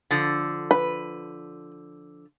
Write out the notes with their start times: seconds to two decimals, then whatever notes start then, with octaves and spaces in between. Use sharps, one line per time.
0.11 D3 F3
0.71 B4